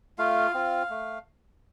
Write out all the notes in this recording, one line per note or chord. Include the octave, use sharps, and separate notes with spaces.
A3 F4 F5
C4 F4
A3